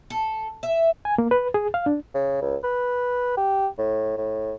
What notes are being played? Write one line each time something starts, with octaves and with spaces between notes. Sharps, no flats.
A4
E5
G#5
A#3
B4
G#4
F5
D4
C#3
C#2
B4
G4
A2
A2